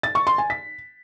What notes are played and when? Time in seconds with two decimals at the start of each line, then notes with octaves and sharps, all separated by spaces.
0.03 A6
0.15 C#6
0.27 C6
0.38 G#5
0.50 B6